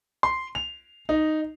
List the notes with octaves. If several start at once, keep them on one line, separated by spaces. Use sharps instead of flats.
C6
F7
D#4